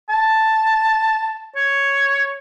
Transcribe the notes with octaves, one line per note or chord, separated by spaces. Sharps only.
A5
C#5